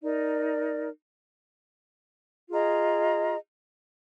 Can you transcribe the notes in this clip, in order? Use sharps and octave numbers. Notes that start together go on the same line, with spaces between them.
D#4 A#4 D5
F4 G#4 D#5 A#5